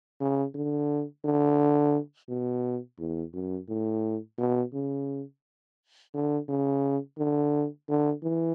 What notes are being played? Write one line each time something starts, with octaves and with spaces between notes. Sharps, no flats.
C#3
D3
D3
B2
E2
F#2
A2
B2
C#3
D3
C#3
D3
D3
E3